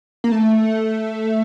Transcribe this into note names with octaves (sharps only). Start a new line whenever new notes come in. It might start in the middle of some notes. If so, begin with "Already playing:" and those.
A#3
A3